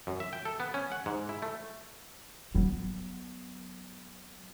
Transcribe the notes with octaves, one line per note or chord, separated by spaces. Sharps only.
F#2
E5
G5
A4
B3
C#4
F#5
G#2
E4
A3
F#3 B3